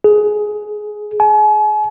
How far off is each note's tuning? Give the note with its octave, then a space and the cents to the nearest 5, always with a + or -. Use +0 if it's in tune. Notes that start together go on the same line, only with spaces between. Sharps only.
G#4 +15
G#5 +40